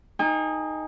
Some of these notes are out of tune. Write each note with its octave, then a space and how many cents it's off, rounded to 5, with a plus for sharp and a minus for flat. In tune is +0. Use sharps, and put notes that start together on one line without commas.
D#4 +0 G#4 +40 G#5 -45